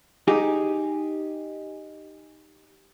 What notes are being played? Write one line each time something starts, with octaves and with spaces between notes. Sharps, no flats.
D#4 G4 G#4